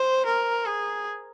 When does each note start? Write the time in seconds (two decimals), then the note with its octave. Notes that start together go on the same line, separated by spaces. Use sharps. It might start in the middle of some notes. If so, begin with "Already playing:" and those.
Already playing: C5
0.26 A#4
0.66 G#4